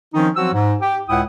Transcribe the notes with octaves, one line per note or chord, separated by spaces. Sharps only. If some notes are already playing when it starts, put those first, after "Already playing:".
D#3 F3 C4 C#4 D#4
F3 F#3 C4 F#4 E6
G#2
G4
C#2 A2 E4 F#5 G5 D#6